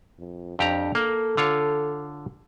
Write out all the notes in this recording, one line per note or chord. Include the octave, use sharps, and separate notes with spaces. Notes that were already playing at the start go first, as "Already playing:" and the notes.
F2
F2 D4 G4 A#5
A#3 A4
D3 F4 C#5